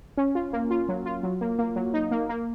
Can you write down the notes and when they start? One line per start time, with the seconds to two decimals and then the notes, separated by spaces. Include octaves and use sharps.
0.18 C#4
0.35 F4
0.53 A#3
0.71 F4
0.89 F#3
1.06 F4
1.23 F#3
1.41 A#3
1.59 A#3
1.76 F#3
1.94 D#4
2.11 A#3
2.29 A#3